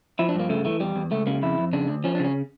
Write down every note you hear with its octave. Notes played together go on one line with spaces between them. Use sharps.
F3 E4
D4
G2 A#3
C#3 A3
E3 A3
E2 G3
E2
C#2 A3
C#3 A#3
F2 E4
F2
C#3 D4
D2
F3 C#4
D4
C#3
C#4